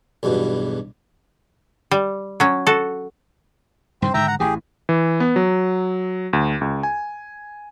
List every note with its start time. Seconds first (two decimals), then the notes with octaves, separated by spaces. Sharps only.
0.23 B1 E2 G2 B2
1.91 G3
2.40 F#3 C#4
2.67 F#4 A4
4.02 G2 C3 D#3 C4 C5
4.14 G#2 D3 D#3 E5 G5 A#5
4.28 F#5 A#5
4.40 A1 E3 G4 G#4
4.89 E3
5.20 B3
5.36 F#3
6.33 D2
6.61 C#2
6.83 G#5